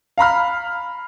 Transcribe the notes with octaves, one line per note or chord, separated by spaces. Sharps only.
F5 A#5 B5 F6